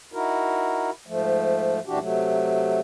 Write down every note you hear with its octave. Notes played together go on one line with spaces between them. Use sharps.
D#4 E4 F#4 A#4
G#2 F3 A3
F#2 A#2 E3 D4 F#4 G4
C3 F#3 A3